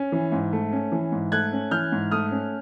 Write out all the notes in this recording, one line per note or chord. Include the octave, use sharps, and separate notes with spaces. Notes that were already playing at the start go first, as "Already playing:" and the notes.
Already playing: C#4
E3
G#2
A3
C#4
E3
G#2
A3 F#6 G#6
C#4
E3 F6 G6
G#2
A3 D#6 F6
C#4